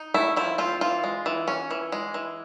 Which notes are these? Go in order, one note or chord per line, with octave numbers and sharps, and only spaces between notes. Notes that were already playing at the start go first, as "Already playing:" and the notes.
Already playing: D#4
A3 E4
F3 E4
C4 F4
E3 F4
G#3
E3
C#4
E3
G#3
E3